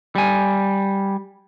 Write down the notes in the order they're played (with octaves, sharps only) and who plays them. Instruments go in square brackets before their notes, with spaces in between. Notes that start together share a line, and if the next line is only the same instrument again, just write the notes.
[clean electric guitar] G3 G#5